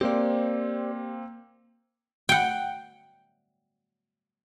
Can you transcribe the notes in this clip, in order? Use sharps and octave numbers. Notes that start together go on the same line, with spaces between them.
A#3 C4 G4 C5 D5
F#5 G5